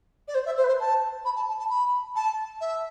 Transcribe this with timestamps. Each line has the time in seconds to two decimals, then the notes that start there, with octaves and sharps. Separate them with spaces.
0.28 D5
0.34 C5
0.46 E5
0.57 C5
0.64 B4
0.68 C5
0.80 A5
1.25 B5
1.36 A5
1.48 A5
1.59 A5
1.70 B5
2.16 A5
2.61 E5